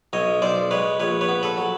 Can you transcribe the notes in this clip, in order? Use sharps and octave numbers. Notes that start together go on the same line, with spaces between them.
B1 C#5 D#5
B1 C5 D5
G#3 B4 C#5
A#1 B4 C#5
B4 C#5
B3
A4 B4
F#3